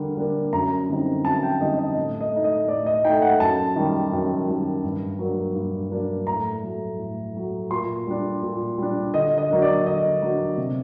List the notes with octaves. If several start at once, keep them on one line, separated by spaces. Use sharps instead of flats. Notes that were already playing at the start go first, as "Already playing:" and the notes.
Already playing: D3 G3 A#3
G3 A#3 D4
F#2 A#5
D3 G3 C4 D#4
F#2 A5
G5
D3 G3 C4 D#4 D#5
D#5
A2
D#5
A3 D#4
D#5
A2 D5
D#5
A3 D#4 G5
F#5
F#2 A5
D#3 G3
F#2
D#3 G3
G2
F#3 A#3 D4
G2
F#3 A#3 D4
A2 A#5
F#3 A3
A2
F#3 A3
A#2 C6
G3 D4
A#2
G3 D4
D3 D#5
D#5
F#3 A#3 D4
D5
D3 D#5
F#3 A#3 D4
C3